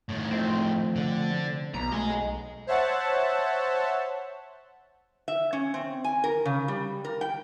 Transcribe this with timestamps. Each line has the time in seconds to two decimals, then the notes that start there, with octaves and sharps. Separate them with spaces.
0.09 A2 D#3
0.31 F3 A3 C4
0.96 D3
1.74 B1 B3 A#5 B5
1.92 G#3 A3 D#5 G#5
2.67 C5 C#5 E5 F#5 A5
5.28 E5
5.53 C#4
5.74 C4
6.04 G#5
6.24 A#4
6.45 C#3
6.68 G3
7.05 A#4
7.21 G5